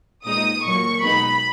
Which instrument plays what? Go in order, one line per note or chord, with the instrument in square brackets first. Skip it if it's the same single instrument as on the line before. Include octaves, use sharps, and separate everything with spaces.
[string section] A#2 G#3 D#4 D#6
A#2 F#3 A#3 C#6
B2 G#3 B3 D#4 B5